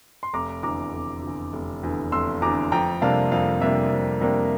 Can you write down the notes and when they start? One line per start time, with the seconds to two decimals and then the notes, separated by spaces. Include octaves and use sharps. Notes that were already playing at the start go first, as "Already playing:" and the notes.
0.23 C6
0.33 F1 A#5 D6
0.63 E2 D3 A#5 D6
0.93 F1
1.23 E2 D3
1.53 F1
1.83 E2 D3
2.12 F1 C6 E6
2.42 E2 D3 A#5 D6
2.72 F2 G5 A#5
3.02 C3 G3 A#3 D4 F5 A5
3.32 F2 F5
3.61 C3 G3 A#3 D4 E5
3.92 F2
4.21 C3 G3 A#3 D4